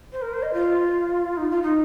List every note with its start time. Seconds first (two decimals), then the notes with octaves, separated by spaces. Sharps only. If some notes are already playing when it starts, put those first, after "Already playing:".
0.12 C5
0.22 A#4
0.33 C5
0.43 D#5
0.54 F4
1.37 D#4
1.50 F4
1.62 D#4